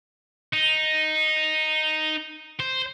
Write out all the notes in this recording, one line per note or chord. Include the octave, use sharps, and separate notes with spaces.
D#4
C5